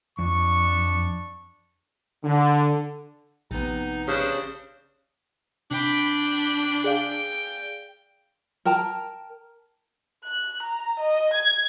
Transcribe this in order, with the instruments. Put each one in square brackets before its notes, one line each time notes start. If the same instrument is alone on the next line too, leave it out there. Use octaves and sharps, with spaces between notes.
[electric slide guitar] F2 [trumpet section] D4 C#6
[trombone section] D3
[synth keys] A#1 [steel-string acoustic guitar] C3 B3 [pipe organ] D#4
[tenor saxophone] C#3 [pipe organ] D4 C5 [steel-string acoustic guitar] G4 B4 D5
[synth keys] C3 [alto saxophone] D4 [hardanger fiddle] G5 B5
[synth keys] G#4 D5 F5 [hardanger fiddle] G5
[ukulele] A#4 G5 A5 A#5
[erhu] F#6
A#5
D#5
G#6